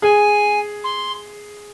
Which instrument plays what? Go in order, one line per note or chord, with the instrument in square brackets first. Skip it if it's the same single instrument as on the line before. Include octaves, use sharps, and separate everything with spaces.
[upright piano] G#4 [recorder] G#5
[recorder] C6